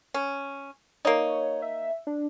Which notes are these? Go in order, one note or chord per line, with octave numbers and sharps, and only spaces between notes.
C#4
A#3 D#4 C#5
E5
D4